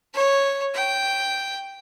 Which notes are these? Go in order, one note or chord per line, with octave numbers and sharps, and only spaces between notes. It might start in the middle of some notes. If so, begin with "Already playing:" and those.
C#5
G5